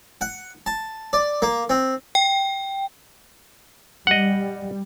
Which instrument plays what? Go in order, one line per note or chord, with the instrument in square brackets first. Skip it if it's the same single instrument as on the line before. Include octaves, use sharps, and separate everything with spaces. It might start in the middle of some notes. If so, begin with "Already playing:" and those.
[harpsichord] F#5
A5
D5
A#3
C4
[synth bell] G5
[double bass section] G3 [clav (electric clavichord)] D#5 F#5